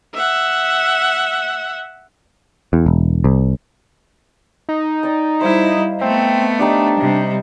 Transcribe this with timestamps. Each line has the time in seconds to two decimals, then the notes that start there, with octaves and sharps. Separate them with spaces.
0.15 E5 F#5
2.73 E2
2.86 E1
3.24 C2
4.69 D#4
5.03 D5 G5 A#5
5.41 G3 E4 C5 D#5 F5
6.01 A3 B3 C4
6.59 D4 D#4 G4 D6
7.00 C3 G3